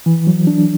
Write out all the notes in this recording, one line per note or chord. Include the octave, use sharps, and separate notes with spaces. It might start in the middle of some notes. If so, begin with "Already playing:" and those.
E3
F#3
D4